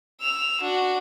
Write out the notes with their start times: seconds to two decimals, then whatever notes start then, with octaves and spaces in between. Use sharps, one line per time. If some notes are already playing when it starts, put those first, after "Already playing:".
0.21 E6 F7
0.61 D4 F#4